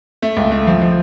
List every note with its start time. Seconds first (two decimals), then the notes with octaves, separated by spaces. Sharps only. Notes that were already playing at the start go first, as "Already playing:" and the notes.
0.22 A3
0.37 C#2
0.51 A3
0.67 F3
0.81 F3